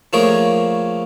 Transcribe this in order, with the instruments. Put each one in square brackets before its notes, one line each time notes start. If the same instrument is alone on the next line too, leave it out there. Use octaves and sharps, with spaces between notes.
[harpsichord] F3 A3 A#3 G#4 A#4 C#5